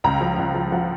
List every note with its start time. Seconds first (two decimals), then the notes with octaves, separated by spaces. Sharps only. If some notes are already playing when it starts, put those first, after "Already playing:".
0.04 C#2 A#5
0.21 F3
0.38 C#2
0.54 F3
0.72 F3 F#5